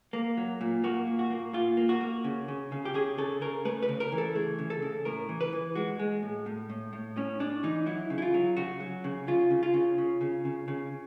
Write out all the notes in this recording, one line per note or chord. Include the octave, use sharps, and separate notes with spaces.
A#3
F#3
A#2
A#3 F#4
A#2
F#4
A#3
A#2 F4
A#3
F#4
A#3
C#3
C#3
C#3
G4
C#3 G#4
C#3 A4
C#3 A#4
A3 B4
B4
C#3
A#4
E3
A4
A3 G#4
C#3
A4
C#3
A2 A#4
E3
B4
E3
G#3 F#4
G#3
A2
A2
A2
A2
A2 C#4
A2 D4
E3 D#4
F#3 E4
C#3
E4
F4
F#3
C#3 F#4
F#3
C#3
C#3 F4
C#3
F4
C#3
C#3
C#3
C#3
C#3